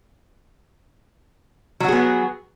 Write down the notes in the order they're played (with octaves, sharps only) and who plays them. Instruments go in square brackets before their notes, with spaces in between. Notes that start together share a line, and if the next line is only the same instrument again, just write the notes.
[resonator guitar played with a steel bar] F#3
F#4
G#4
B3